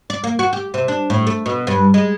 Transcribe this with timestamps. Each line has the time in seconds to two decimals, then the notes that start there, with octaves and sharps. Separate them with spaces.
0.10 D5
0.24 A#3
0.39 F#4
0.53 G4
0.74 C3
0.88 D4
1.10 A2
1.27 A3
1.46 B2
1.67 G2
1.94 G#3